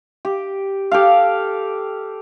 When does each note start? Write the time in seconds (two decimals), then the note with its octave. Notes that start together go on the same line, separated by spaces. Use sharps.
0.25 G4
0.91 G4 A4 F5